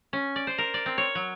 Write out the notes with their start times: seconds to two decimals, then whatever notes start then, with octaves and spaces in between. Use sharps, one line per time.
0.13 C#4
0.36 D5
0.47 C5
0.58 A#4
0.74 D5
0.86 C4
0.98 C#5
1.15 F#3